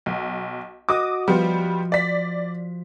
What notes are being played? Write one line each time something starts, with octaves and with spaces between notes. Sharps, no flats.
B1
F#4 D#5 D6 D#6
F3 G3 B3 F4
D5 B6